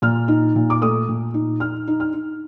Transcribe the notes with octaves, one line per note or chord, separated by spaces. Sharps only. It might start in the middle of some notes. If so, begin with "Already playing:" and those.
A#2 F6
D#4
A#2
D6
A3 D#6
A#2
D#4
D#4 F6
D#4
F6
D#4